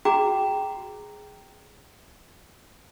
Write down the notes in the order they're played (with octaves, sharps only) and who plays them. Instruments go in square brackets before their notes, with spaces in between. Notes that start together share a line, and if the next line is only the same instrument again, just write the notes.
[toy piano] F#4 G#4 G5 A#5 D6